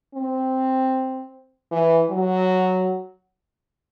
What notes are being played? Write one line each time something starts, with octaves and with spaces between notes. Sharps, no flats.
C4
E3
F#3